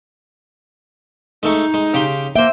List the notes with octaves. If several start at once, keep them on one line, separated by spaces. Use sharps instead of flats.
G#3 A3 D#4 C#6
G#3
C#3 G4 C6
A#3 C5 E5 G5